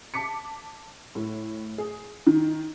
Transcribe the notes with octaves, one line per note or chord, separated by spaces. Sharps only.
A5 D6 B6 C#7
A2
G#4
D#3